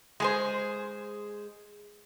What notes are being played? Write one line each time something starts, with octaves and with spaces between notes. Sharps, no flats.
G#3 G#4 C5